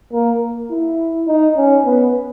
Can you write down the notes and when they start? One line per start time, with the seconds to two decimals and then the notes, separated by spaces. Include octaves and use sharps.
0.12 A#3
0.70 E4
1.27 D#4
1.56 C#4
1.85 B3